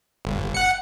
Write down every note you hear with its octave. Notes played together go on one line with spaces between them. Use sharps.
G1
F#5 C#7